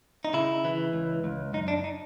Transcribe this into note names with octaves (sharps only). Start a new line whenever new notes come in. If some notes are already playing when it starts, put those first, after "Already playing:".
D#4
C#3 E4
E3
C#2
C#2
F#2 D#4
D4
D#4